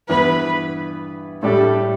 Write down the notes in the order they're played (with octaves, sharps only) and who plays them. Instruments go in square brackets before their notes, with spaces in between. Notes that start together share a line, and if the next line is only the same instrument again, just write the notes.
[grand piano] G2 E3 B3 [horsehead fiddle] B4
[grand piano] A2 G3 D4 G4 [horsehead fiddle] A4